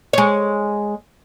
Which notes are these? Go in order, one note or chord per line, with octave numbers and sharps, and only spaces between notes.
G#3 C#5